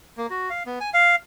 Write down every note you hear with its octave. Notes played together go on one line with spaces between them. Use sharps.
A#3
F#4
F5
B3
G#5
F5